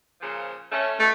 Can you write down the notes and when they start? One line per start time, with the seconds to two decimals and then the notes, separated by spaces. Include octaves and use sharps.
0.21 A#2 C#3 F3
0.72 A3 C#4
0.99 B2 A3